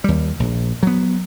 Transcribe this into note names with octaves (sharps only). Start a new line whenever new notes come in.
D#2 G3
A#1
F#3 B3